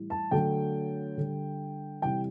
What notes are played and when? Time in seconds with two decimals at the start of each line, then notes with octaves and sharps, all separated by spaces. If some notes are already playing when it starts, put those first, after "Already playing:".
Already playing: A2 E3 G3
0.10 A5
0.31 D3 F#3 A3 G5
1.17 D3 G3
2.02 C3 E3 G3 G5